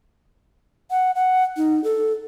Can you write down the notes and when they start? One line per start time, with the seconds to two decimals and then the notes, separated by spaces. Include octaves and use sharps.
0.91 F#5
1.15 F#5
1.57 D#4
1.84 A4